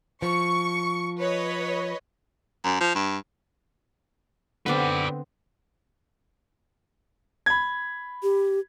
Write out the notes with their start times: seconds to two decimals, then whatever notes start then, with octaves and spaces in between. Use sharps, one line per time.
0.22 F3 C#6
1.19 B4 C#5 D#5
2.64 F#2
2.81 F3
2.95 G2
4.66 D3 B3 C4 B4 D5
7.46 B5 G#6
8.23 G4